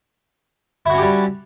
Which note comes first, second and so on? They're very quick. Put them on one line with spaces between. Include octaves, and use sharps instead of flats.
E4 F#4 C#4 G4 G3